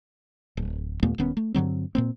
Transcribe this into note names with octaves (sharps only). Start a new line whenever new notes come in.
D1
D#2 A#2 A3 B3
D#1 D#3 B3 C#4
A3
G2 D3 F#3 C4
A#2 A#3 C4